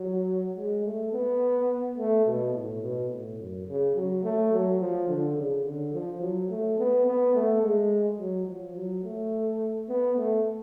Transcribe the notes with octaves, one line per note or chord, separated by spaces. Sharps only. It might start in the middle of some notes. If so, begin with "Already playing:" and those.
Already playing: F#3
G#3
A3
B3
A3
B2
A2
B2
A2
F#2
C#3
F#3
A3
F#3
F3
D3
C#3
D3
F3
F#3
A3
B3
B3
A3
G#3
F#3
F3
F#3
A3
B3
A3